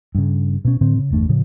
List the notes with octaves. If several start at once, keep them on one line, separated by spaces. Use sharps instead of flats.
G2 C#3
B2 C#4
A2 D3 C4
C#3
G1 E2 A3 D4
A2 C#3 F3